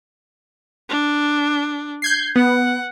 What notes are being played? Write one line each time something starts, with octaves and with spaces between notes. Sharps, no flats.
D4
G6 G#6 C7
B3 F#5